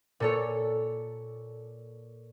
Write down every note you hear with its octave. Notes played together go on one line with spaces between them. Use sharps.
A#2 A4 C#5